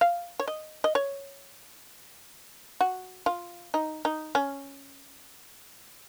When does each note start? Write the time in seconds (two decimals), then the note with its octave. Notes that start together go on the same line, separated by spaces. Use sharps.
0.01 F5
0.39 C#5
0.48 D#5
0.84 D#5
0.95 C#5
2.81 F#4
3.26 F4
3.74 D#4
4.05 D#4
4.35 C#4